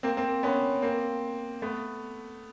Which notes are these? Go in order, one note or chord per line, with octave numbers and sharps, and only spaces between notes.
A#3 C4
A#3 C4
B3 C#4
A#3 C4
A3 B3